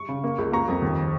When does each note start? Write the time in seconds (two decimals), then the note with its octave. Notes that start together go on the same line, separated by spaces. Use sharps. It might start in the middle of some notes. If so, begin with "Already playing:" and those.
Already playing: C#6
0.08 C#3
0.24 A#3
0.38 C#2
0.52 A#3 A#5 C#6
0.68 F2
0.82 D#2